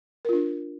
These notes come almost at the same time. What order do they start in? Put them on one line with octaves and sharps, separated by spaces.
A#4 F4 D4